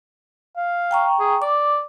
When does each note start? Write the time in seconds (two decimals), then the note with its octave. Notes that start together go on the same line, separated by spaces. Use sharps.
0.57 F5
0.91 G5 A#5 C#6
1.20 G#4
1.42 D5 D6